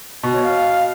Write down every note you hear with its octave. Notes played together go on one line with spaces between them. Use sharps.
B2
C#5
F5